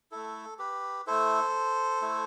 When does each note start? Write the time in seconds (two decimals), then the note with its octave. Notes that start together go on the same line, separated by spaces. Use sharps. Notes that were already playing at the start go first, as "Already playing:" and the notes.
0.11 A3 E4 A4
0.59 G4 B4
1.07 A3 E4 A4 C5
2.02 A3 E4